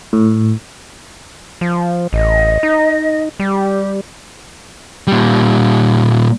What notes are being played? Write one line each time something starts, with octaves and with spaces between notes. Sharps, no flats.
A2
F3
A1 D#5
D#4
G3 G4
A#2 G3